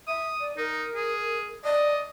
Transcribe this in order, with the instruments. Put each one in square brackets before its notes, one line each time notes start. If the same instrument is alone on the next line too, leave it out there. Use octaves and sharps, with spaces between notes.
[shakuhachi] E5 [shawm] D#6
[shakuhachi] D5
[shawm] D#4 [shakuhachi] A#4
[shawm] G#4
[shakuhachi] D5 [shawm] D#5